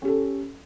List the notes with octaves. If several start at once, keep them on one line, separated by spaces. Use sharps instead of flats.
C#4 G4 A4